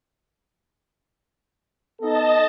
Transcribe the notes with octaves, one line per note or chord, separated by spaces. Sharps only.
B3 D#4 A4 D#5 A5